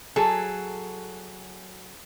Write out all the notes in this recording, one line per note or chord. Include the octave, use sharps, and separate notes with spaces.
F#3 G#4 A4